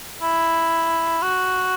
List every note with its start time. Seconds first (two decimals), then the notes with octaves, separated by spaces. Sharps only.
0.22 E4
1.22 F#4